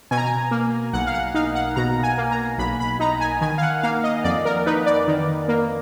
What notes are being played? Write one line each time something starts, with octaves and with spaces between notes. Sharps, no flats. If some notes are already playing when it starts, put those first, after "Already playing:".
B2 G#5
A#5
G#5
A#3
B1 F#5
F5
F#5
D#4 F5
F#5
B2 A#5
G#5
A#3
A#5
B1 B5
B5
D#4 A#5
G#5
D#3 G#5
F5
F#5
A#3 F5
D#5
F2 D5
A#4
D#4 B4
D5
D#3
A#3